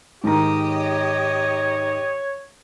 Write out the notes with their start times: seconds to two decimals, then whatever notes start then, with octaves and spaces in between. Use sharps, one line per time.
0.24 G#2 D#3 G4 D#5 A#5
0.68 C#5